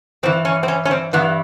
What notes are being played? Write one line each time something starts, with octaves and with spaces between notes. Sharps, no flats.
G2 E3 C4
C#4
C4
C#4
C#4
C4
G2 E3 B3